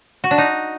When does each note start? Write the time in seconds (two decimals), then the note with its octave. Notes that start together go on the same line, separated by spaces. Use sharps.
0.24 F#4
0.31 D4
0.38 D#4